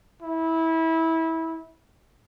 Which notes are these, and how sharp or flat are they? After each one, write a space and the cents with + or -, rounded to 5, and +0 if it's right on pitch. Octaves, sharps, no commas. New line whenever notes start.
E4 -20